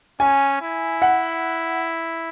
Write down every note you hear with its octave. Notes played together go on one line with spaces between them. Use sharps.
C#4 G#5
E4
F#5